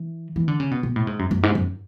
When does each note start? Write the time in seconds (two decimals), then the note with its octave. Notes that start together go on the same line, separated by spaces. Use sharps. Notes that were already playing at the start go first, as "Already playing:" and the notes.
Already playing: E3
0.36 E3
0.48 D3
0.60 C#3
0.71 B2
0.83 B2
0.96 A2
1.07 G#2
1.19 F#2
1.31 F#2
1.43 G#2
1.55 F#2